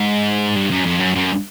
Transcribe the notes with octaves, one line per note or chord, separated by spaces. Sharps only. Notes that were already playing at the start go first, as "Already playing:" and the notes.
Already playing: G#2
G2
F#2
F2
F#2
F#2